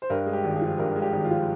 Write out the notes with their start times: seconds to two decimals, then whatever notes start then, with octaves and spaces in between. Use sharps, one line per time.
0.02 C5
0.10 G2 A#4
0.26 G#3
0.33 G4
0.44 G#1
0.56 G#4
0.62 F3
0.78 G2 A#4
0.96 G#3
1.02 G4
1.13 G#1
1.24 F4
1.31 F3